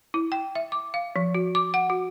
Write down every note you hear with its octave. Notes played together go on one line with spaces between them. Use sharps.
E4
G5
E5
D6
F5
F3
F#4
D6
F#5
F#4